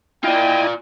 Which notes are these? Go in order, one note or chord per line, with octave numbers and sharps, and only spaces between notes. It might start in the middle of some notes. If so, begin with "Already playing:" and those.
E4 F4 D5 D#5 G5 G#5